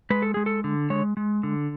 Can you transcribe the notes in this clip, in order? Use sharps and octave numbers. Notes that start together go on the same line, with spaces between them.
G#3 B4
A4
G#3 G#4
A4
D3
G#3 C#5
G#3
D3